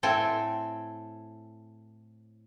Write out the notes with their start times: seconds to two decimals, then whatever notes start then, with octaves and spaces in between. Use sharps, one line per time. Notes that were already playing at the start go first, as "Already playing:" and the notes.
0.03 A2 C4 A4 G5 G#5